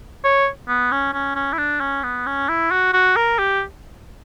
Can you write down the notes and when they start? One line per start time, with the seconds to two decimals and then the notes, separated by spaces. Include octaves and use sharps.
0.24 C#5
0.68 B3
0.92 C#4
1.14 C#4
1.36 C#4
1.53 E4
1.58 D4
1.80 C#4
2.03 B3
2.26 C#4
2.49 E4
2.71 F#4
2.93 F#4
3.16 A#4
3.38 G4